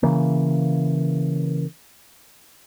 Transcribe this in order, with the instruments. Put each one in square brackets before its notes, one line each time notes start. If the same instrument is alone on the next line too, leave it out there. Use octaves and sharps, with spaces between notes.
[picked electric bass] C#3 E3 A#3